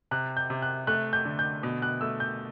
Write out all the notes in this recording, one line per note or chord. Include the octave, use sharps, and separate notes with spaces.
C3 F#6
G6
C3
F#6
A3 F#6
G6
D3
G6
B2
F#6
A3 E6
G6